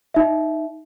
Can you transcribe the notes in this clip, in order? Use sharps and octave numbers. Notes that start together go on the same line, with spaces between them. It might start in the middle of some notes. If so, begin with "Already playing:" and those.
D#4 E5